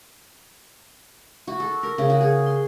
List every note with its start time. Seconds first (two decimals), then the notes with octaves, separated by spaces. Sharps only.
1.47 F#4
1.60 A4
1.83 A#4
1.98 C#3
2.10 F#4
2.21 G#4
2.46 C6